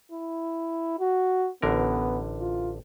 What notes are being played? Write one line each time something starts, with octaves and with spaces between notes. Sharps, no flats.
E4
F#4
A1 D3 B3 A#4
F4